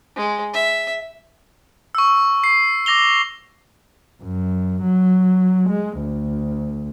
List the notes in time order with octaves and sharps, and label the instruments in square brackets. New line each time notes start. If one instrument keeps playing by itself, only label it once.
[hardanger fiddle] G#3
E5
[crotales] C#6 E6
C7
D6 A#6 F7 G7
[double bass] F#2
F#3
G#3
D2